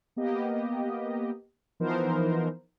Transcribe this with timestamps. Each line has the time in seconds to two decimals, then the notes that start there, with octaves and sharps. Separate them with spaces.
0.16 A#3 B3 G4 D#5
1.80 E3 F3 B3 D#4 A#4 C5